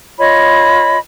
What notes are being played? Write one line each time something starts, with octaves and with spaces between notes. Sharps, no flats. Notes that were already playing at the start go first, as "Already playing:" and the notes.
F4 C#5 D#5 B5